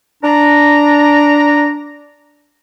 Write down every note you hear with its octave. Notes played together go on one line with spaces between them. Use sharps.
D4 A#5